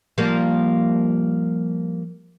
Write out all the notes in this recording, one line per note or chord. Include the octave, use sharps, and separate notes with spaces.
F3 G3 A#3